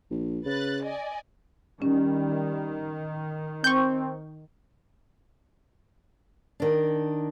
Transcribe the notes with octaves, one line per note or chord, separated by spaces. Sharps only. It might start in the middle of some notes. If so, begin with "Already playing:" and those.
A#1
C#3 B4 F#6 A6
D5 D#5 G#5
D#3 G3 C#4
C4 C#6 G6
D#3 D4